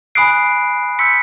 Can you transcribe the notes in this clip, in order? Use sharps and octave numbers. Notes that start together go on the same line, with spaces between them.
G#5 B5 D#6 F#6 C7 D7
C6 E6 G6 B6 C#7